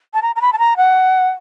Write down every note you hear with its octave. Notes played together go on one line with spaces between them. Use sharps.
A5
A#5
A#5
B5
A5
A#5
F#5